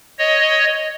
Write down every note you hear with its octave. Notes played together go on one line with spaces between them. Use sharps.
C#5 D#5